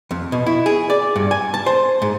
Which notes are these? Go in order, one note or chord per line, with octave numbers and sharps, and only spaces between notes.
F2
B2
E4
G#4
D5
G2
G#5
A5
C5
G#2